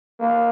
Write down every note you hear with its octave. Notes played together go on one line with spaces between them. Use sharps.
A#3